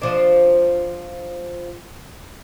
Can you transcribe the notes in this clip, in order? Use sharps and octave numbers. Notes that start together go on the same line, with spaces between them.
F3 D4